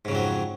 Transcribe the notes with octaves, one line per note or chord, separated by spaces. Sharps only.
F2 G#2 C#3 F#3